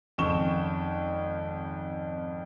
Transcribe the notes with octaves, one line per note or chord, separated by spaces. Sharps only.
G#1 F2 C#3 C#6 E7 G7